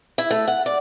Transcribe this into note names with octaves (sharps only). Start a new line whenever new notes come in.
E4
A3
F#5
D5